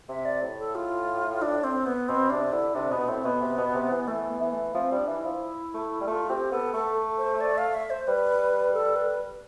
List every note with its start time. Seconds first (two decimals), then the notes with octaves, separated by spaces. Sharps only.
0.09 C3 E5
0.25 D5
0.42 A2
0.59 A4
0.75 F4
1.42 D4
1.64 C4
1.86 B3
2.09 B2 C4
2.30 C3 D4
2.52 D3 E4
2.75 C3 D4
2.91 B2 B3
3.08 A2 C4
3.24 B2 B3
3.42 C3
3.58 B2
3.75 C3
3.91 E3
4.08 E3 A3
4.30 B3
4.41 E3
4.52 A3
4.75 F3 C4
4.92 G3
4.97 D4
5.07 E3
5.19 E4
5.25 F3
5.74 A3
6.01 G3
6.07 A3 F4
6.29 C4 G4
6.52 B3 A4
6.74 A3 A4
7.18 C5
7.41 D5
7.58 F5
7.74 E5
7.90 C5
8.07 G3 B4
8.74 A4
8.96 B4